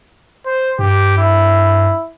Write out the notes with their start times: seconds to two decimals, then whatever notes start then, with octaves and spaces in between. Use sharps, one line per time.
0.46 C5
0.79 G2 G4
1.18 E4